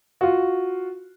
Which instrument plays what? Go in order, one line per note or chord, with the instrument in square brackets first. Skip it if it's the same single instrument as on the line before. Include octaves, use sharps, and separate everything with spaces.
[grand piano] F4 F#4